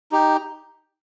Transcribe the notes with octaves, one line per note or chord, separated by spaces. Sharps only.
D#4 G4